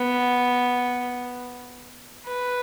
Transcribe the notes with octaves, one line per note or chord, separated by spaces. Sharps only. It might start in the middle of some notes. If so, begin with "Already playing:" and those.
Already playing: B3
B4